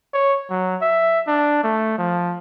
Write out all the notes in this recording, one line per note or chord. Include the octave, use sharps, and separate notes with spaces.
C#5
F#3
E5
D4
A3
F3